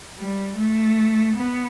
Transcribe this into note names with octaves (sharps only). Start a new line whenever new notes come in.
G3
A3
B3